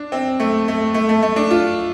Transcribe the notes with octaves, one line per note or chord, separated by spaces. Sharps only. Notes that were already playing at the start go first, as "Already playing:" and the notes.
Already playing: D4
C4
A3
A3
A3
A3
A3
D4
F4